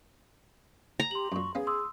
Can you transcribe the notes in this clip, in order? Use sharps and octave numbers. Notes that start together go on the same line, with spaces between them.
A#5
G4 C6 F#7
F#2 A#2 C#6
B3 C#4 G#4 F5
C6 D#6 E6